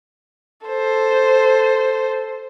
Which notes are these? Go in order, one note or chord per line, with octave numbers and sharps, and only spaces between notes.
A4 C5